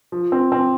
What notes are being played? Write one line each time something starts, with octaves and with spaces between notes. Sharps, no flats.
F3
C4
C4